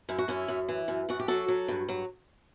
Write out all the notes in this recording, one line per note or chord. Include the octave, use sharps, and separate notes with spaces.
F#2 E4
F#4
F#2 C#4 E4
F#2
E3
F#2
F#2 F#4
G4
F#3 F#4 A4
F#3
G2
F#3